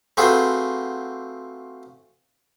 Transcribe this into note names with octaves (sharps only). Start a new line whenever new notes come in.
A3 C4 F4 F#4 G#4 B4